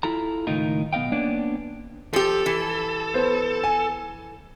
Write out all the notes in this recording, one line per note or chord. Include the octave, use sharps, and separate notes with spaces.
E4 F4 A4 A#5
C#2 A2 D#3 D#4 F4 A#4
B1 B3 D#5 F5 G5
A#3 B3 C#4 D4 D5
F3 G4 A4
E3
B3 C5
G#5